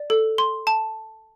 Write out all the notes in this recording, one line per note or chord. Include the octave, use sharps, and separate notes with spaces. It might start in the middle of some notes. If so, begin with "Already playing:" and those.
Already playing: D5
A4
C6
A5